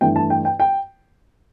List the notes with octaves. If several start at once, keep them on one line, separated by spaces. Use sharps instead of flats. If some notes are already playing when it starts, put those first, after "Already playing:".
G2 E3 A3 G5
A5
G5
G5
G5